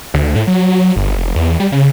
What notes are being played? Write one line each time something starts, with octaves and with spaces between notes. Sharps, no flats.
D2
A2
F#3
G1
F1
E2
G3
C#3